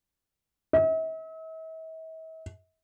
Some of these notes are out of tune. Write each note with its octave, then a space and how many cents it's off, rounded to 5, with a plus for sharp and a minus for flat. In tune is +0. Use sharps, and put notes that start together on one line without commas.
E5 -45